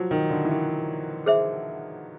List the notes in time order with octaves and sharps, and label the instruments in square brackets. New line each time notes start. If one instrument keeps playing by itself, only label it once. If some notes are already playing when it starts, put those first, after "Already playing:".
Already playing: [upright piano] F3 F#3
D#3
D3
E3
D#3
[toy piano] G#4 C5 E5